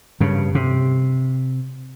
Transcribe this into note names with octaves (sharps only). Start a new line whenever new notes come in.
G2 C#3
C3